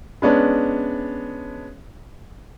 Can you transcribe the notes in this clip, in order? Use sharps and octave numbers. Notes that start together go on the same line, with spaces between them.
G#3 B3 C#4 D4